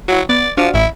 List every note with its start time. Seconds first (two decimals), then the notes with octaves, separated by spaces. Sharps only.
0.08 F#3 E4 F#4
0.29 B3 D5
0.57 F3 D4 F#4 F5
0.74 A1 A2 E4